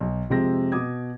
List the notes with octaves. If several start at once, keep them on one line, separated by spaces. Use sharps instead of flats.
B1
F2 C3 G#3 C4 G#4 A#6
B2 D6 D#6 G#6